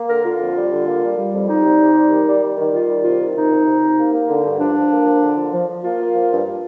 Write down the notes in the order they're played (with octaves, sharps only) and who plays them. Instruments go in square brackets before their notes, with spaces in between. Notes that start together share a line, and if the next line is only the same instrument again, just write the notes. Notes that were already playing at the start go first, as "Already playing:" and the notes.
Already playing: [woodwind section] A#3
D3 A#4
D3 F4
F2
G3
D3
A#3
G3
G3
F2
G3 D#4
C3
C3
G3
D#3
G3
G3
D#3
D#3 F4
G3
C3 F4
D#3
C3 D#4
C3
C3
C3
A#3
A#3
D3
G2
F3 D4
F3
A#3
F3
D3
F3
F3
F3
A#3 F4
A#3
F3
G2